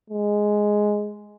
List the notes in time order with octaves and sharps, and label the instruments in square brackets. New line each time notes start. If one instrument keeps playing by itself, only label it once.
[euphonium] G#3